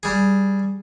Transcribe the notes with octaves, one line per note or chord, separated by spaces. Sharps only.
G3 G#4